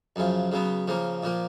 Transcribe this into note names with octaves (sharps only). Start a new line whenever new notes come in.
F#2 C#3 F3
C#3 F#3 B3
C#3 F3 A#3
A#2 F3 A#3